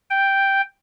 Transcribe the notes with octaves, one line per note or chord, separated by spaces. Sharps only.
G5